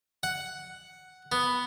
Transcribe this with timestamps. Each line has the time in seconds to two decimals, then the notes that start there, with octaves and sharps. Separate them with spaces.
0.23 F#5
1.32 B3